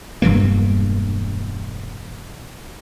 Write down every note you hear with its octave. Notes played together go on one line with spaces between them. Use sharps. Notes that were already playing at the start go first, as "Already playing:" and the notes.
E1 G2 E3 A#3